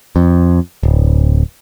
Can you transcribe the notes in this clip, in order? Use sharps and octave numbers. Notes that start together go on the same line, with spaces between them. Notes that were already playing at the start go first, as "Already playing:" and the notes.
F2
D1